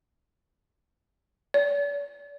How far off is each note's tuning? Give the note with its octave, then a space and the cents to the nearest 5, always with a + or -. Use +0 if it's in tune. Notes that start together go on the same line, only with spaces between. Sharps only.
D5 -45